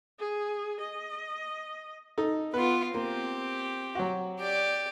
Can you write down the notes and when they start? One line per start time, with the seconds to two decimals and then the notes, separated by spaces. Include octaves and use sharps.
0.19 G#4
0.80 D#5
2.18 D#4 A4
2.54 B3 F4 B4
2.94 A#3 C4 G4
3.95 F#3 F#4
4.39 G4 D5